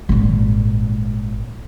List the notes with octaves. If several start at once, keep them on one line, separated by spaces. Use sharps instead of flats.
G#1 A#2